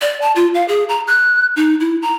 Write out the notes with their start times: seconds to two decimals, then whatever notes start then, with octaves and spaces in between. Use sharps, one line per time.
0.01 D5
0.22 A5
0.36 F4
0.54 F5
0.68 G#4
0.89 A#5
1.07 F#6
1.56 D#4
1.80 E4
2.02 A#5